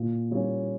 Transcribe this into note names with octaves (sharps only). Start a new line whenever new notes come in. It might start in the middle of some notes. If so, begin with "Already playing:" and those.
Already playing: A#2
G3 A#3 C#4 C#5